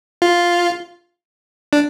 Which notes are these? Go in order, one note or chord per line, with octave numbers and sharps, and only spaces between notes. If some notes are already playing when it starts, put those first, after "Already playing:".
F4
D4